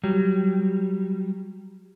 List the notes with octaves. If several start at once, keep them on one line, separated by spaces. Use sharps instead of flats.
F#3 G3